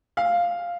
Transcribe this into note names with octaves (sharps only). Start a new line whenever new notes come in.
F5